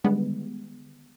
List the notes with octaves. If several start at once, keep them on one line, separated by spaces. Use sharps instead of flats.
D3 D#3 G3 G#3 B3